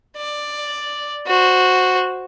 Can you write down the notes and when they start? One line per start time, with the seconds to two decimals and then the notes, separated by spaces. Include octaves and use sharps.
0.17 D5
1.27 F#4 C5